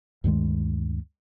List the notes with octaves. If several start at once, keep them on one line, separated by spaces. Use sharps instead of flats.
D2 G2 D#3 G#3